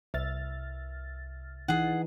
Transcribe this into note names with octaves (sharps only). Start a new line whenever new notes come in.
C2 E5 F6 A6
E3 D#4 G#4 F#5